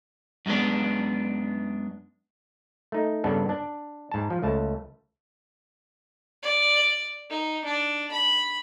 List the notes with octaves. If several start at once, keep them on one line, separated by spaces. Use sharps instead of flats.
F#2 G3 G#3 B3 D4
A3 D#4
G2 C#3 B3 D4 A4
D4
G#2 A5
F3
C#2 A3 A5
D5
D#4
D4
B5